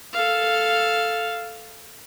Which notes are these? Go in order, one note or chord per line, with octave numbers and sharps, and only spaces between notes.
A4 F5